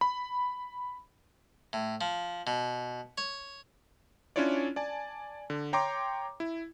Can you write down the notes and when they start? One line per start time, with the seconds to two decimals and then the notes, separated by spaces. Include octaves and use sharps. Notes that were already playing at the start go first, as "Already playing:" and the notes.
0.01 B5
1.73 A2
2.01 F3
2.47 B2
3.18 C#5
4.36 C#4 D4 E4 F4 C#5 D5
4.76 D5 G#5 A5
5.50 D3
5.73 C#5 G5 A#5 C6 D6
6.40 E4